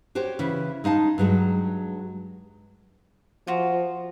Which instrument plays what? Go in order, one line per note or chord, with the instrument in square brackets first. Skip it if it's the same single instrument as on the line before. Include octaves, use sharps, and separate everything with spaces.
[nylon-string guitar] F#4 G4 C5 C#5
C#3 E3
G#3 D#4 F5 A5
G2 F#3 G#3
[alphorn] F3 [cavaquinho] F4 F#4